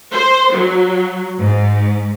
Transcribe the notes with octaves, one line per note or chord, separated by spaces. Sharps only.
C5
F#3
G#2